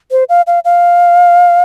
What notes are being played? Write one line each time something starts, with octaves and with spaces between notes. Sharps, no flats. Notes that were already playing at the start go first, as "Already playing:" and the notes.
C5
F5
F5
F5